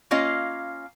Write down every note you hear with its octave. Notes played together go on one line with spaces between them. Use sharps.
A#3 C#4 F4 D#5 F5